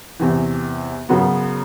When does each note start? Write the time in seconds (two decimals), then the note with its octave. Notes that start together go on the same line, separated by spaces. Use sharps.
0.19 E2 C3 E3
1.09 F#2 C#3 F#3 B3